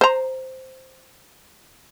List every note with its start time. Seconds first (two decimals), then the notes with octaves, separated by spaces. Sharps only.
0.01 C5 A#5